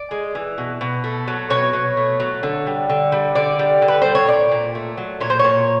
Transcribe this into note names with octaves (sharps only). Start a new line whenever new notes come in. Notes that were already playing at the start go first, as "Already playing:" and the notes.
Already playing: D5
G#3
E3
B2
B2
A3
F#3
B2 C#5
B2
A3
F#3
D3
G3
D3
G3
D3 D5
G3
D3
B4
G3 C5
C#5
A#2 D5
A#2
A3
F#3
A#2 C#5
C5
A#2 C#5